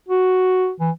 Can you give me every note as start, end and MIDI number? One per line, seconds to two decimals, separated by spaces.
0.08 0.71 66
0.80 0.91 52